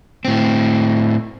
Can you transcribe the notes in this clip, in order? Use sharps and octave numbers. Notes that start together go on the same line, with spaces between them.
A2 C4